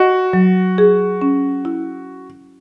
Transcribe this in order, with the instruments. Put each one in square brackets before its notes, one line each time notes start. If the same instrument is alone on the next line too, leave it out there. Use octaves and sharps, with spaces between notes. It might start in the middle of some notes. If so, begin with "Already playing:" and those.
Already playing: [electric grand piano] F#4 [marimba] D#5
[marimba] F#3
G#4
C#4
E4